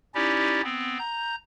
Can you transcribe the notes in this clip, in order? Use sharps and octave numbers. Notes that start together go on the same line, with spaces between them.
C#4 D#4 E4 G4 D5
B3 C4
A#5 G6